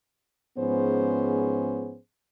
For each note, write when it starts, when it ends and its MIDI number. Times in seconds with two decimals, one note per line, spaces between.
0.58 1.98 44
0.58 1.98 53
0.58 1.98 59
0.58 1.98 61
0.58 1.98 68
0.58 1.98 72